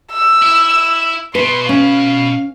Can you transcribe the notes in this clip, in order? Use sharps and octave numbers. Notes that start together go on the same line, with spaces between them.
E6
E4
B2 B4 C6
C#4 F5